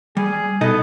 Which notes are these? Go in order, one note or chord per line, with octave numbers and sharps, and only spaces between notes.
G3 G#4
B2 B3 D#4 A4 D#5